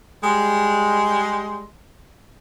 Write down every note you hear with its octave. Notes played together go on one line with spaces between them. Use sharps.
G3 G#3